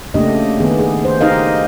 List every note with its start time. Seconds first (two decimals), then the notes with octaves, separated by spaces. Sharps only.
0.14 C#3 A3 A#3 D4 G4 D#5
0.60 D#3 B3 G#4
0.79 G#4
1.05 C5
1.21 D#4 G4 A#4 D#5 F5